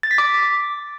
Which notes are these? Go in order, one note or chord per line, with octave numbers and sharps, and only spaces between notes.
A6
B6
D6